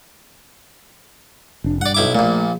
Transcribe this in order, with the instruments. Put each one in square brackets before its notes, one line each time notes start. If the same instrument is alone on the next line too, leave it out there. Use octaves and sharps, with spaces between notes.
[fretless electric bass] F1 D4
[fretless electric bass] G2 [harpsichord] D5 F#5
[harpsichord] B1 E4 D6
[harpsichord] A#1 A#2 [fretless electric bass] A3